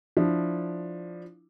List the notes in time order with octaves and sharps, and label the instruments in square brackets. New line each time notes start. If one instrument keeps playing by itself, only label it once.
[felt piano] F3 D4 E4